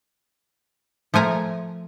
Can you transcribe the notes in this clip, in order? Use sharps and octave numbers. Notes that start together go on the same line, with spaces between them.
F3 A3 G#5 A#5